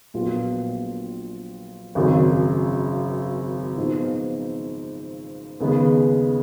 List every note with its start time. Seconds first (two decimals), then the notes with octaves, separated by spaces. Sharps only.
0.14 A#1 A#2 F#3 B3 F4
1.95 G#1 F#2 C#3 F#3
3.77 G#2 F3 B3 F4
5.60 D#2 C#3 G#3 B3